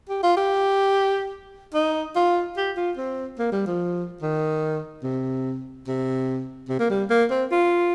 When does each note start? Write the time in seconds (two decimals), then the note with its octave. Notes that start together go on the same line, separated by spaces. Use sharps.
0.09 G4
0.23 F4
0.37 G4
1.74 D#4
2.16 F4
2.57 G4
2.77 F4
2.97 C4
3.39 A#3
3.52 G3
3.67 F3
4.22 D#3
5.04 C3
5.87 C3
6.69 C3
6.80 A#3
6.90 G3
7.10 A#3
7.31 C4
7.51 F4